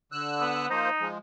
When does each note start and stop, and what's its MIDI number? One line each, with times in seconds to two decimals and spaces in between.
0.12 0.67 50
0.12 0.67 88
0.12 0.67 90
0.41 0.66 59
0.70 0.90 53
0.70 0.90 58
0.70 1.06 63
0.70 0.90 72
1.00 1.18 53
1.00 1.18 56